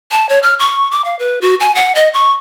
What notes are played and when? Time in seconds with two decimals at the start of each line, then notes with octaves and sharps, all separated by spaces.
0.12 A5
0.29 C#5
0.43 F6
0.59 C#6
0.91 D6
1.05 F5
1.19 B4
1.41 F#4
1.60 G#5
1.75 F#5
1.95 D#5
2.14 C#6